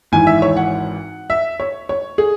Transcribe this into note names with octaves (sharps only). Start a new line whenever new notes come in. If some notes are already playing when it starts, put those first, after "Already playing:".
G#1 G#2 E3 G#5
E5
C#5
F#5
E5
C#5
C#5
G#4